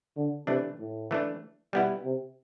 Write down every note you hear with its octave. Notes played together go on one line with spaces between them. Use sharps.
D3
C3 E3 A3 D4
A2
E3 A3 D4
B2 G3 B3 E4
C3